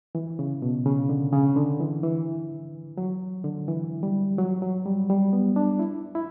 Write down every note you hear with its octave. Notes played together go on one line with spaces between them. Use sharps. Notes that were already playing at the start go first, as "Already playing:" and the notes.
E3
C#3
B2
C#3
D3
C#3
D3
E3
E3
F#3
D3
E3
G3
F#3
F#3
G3
G3
B3
D4
E4
E4